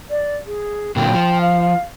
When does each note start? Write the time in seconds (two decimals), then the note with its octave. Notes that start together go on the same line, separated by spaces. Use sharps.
0.10 D5
0.47 G#4
0.96 A#2 D3 F#3 G5
1.14 F3
1.41 F5